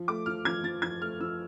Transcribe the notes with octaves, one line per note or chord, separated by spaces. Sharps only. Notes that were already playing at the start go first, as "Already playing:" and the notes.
Already playing: F3
A3 D6
F3 F6
F3 G#6
F3 A6
F3 G#6
A3 F6
F3 E6